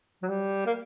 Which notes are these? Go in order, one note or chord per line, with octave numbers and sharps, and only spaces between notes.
F#3
G3
A#3